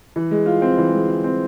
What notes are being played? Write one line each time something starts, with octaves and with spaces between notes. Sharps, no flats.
E3
G#3
F4
C4
E3
G#3
F4
C4